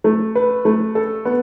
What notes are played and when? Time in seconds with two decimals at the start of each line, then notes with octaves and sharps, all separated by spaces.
0.04 A3
0.35 B4
0.65 A3
0.95 A4
1.25 B3